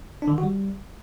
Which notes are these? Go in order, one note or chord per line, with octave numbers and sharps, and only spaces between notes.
D4
D3
D#3
F#4
G3